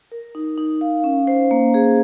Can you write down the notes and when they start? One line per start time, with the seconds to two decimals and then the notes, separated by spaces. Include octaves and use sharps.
0.12 A#4
0.35 D#4
0.58 D#4
0.81 F5
1.04 C#4
1.27 C5
1.51 A#3
1.74 G#4